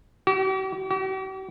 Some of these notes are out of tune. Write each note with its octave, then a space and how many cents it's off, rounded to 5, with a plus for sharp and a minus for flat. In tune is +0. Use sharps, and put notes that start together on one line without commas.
G4 -45
G4 -45